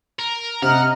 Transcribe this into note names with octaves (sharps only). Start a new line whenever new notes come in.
A#4
C3 D#5 F#5 A#5 F6